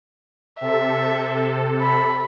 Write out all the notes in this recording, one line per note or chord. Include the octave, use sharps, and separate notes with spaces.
C3 A4 E5
B5